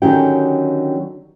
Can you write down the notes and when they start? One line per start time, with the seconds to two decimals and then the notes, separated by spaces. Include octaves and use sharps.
0.02 D3 D#3 F#3 C#4 G4 G5